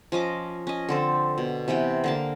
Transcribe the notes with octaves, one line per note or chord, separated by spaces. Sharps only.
F3 C#4 D#5 D6
C#4 D#5
D3 C4 A4
B2
C3 E3 B3 G5
D3 A#3 A5